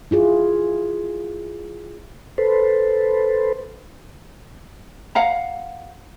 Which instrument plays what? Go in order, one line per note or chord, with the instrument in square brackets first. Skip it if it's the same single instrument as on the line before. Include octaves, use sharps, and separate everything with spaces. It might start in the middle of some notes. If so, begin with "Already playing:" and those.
[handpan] E4 F4 G#4
[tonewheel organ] A4 B4 C5
[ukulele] F5 F#5 A#5